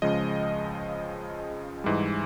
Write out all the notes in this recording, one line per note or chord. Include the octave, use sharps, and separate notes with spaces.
C#2 C#3 F3 G#3 D#5
G#2 E3 G3